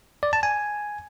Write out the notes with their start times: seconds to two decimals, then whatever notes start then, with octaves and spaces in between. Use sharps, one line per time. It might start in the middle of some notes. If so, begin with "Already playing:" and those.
0.23 D5
0.33 A5
0.43 G#5